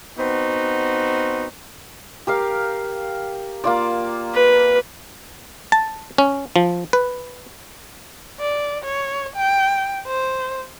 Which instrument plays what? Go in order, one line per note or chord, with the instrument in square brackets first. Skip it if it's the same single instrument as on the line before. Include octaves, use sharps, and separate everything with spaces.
[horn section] B3 C4 D#4 F#4
[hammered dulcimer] G4 A#4 F5
A#3 F4 D5
[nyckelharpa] B4
[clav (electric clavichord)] A5
C#4
F3
B4
[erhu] D5
C#5
G5
C5